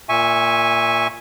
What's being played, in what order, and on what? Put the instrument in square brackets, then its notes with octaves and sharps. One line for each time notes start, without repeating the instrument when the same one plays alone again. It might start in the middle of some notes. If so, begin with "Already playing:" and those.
[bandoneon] A#2 E5 G#5 C#6